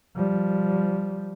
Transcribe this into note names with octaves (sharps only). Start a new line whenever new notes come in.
F3 G3